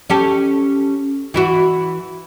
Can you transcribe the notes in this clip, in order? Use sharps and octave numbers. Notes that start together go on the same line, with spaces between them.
C#4 G4 A4
E3 E4 F#4